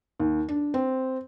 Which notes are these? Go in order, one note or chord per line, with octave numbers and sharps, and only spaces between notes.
D#2
D4
C4